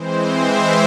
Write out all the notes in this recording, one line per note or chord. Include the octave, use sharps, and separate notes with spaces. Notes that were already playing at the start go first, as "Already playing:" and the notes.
Already playing: E3 G#3 C4 C5
E5